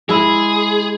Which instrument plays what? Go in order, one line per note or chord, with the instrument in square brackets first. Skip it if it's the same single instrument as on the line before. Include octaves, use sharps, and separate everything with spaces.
[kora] G#3 E4 [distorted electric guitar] G#4